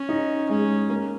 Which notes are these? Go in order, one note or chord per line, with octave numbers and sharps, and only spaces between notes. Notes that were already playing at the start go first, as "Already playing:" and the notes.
Already playing: C#4
D#4
G#3 C#4
A#3